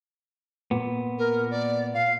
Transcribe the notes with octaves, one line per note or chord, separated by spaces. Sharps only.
A#2 B3
A#4
D5
F5